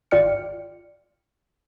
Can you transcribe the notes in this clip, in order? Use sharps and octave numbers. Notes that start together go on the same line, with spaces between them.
G#1 F4 D5 G5 F6 C#7